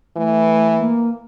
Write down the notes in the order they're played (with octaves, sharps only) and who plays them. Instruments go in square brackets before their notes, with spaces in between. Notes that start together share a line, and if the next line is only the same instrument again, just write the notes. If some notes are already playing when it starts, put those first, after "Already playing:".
[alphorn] E3 [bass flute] A3
[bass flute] A#3